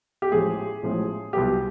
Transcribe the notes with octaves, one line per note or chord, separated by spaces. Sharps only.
G4
A1 A2 F3 G#3 G#4
A1 A2 F3 G#3
C2 B2 F#3 B3 G4